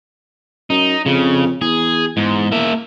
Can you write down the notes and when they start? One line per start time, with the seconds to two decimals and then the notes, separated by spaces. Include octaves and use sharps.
0.70 F#2 D#4
1.06 F2 C#3
1.62 E2 G#4
2.17 E2 G#2
2.52 A#3 E5